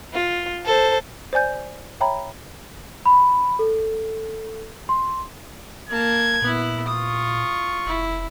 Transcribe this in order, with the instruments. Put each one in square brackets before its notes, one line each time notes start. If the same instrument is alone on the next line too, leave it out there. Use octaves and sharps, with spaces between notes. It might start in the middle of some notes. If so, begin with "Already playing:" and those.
[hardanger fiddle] F4
A4 C5
[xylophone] C5 D5 G#5 G6
C#5 E5 G5 A#5 B5
[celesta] B5
A4
C6
[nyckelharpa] A#3 A5 [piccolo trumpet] G#6
[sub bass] A#2 [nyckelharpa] B3 E4
[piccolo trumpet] F4 [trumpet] C#6 [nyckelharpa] D#6
[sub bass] F1 [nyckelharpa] E4